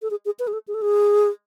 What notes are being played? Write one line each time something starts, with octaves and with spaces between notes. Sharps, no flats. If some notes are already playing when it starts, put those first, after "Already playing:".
A4
G#4
G#4
B4
G#4
A4
G#4
A4
G#4